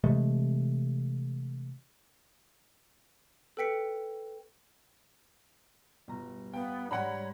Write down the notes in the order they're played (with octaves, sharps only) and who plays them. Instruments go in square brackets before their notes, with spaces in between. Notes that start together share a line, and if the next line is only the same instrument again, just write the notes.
[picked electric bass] C3 E3 G#3 A3
[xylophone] A4 B4 G5 B6 C#7
[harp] G1 A#5 [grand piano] B2
[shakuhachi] B3 [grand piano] F5 G5
[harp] G#2 G3 [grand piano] D4 [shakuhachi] C#5 [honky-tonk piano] F#5 A#5 B5